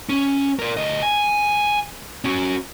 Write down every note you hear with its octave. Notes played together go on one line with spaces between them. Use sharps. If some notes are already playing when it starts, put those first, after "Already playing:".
C#4
A#4 D5
D2 D#5
G#5
C#4 F#4